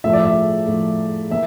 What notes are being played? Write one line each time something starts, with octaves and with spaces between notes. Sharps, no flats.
A2 F3 A3 E5
D5
E5
A2 F3 A3
E3 A#3 E5